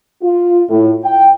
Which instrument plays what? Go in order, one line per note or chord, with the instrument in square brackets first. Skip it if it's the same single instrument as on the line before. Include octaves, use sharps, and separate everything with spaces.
[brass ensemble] F4
A2
G5